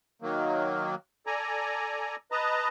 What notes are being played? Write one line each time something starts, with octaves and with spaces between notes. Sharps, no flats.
D#3 F#3 A#3
A4 D5 G#5 A#5
B4 D#5 A5 A#5